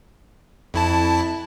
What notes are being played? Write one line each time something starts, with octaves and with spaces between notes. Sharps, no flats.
F2 E4 A5